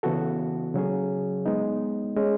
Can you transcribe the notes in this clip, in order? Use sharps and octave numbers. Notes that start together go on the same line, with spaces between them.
C#3 E3 B3 F#4 A4
C#3 F#3 C#4 G#4
G#3 B3 D#4
G#3 C#4 G#4